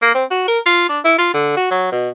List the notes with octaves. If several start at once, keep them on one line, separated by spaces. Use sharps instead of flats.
A#3
C4
F#4
A#4
F4
D4
E4
F4
D3
F#4
F#3
B2